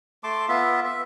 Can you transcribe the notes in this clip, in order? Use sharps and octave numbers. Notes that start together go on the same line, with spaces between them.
A3 A5 C6 D6
B3 F4 E5
E5